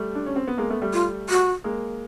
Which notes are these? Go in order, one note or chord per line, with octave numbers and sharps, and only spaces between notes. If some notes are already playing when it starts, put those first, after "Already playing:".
Already playing: G3 A3
D4
C#4
C4
B3
G#3 A#3
A3 B3
G3 A3
F4
F#4
G#3 A#3